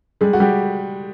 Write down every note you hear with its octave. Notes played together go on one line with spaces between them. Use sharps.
G3 G#3 G#4
F#4
G3 G4